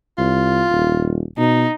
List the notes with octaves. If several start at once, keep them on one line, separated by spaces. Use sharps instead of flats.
C2 F4
D#1
B2 D#4